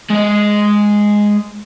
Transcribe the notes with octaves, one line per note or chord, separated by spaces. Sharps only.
G#3 D#5